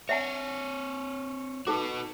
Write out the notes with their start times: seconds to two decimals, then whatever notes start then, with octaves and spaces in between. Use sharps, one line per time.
0.09 C4 C#5 E5 F#5 G#5
1.67 D#4 F#4 A4 B4 D6